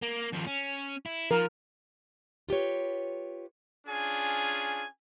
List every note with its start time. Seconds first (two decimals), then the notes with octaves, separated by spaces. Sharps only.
0.02 A#3
0.33 D#2 F3
0.47 C#4
1.06 E4
1.31 F3 A#4
2.49 F4 G4 B4 C#5
3.87 C#4 D4 F4 G#4 G#5